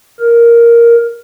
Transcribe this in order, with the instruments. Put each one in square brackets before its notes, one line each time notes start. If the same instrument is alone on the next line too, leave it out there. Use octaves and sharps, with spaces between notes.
[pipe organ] A#4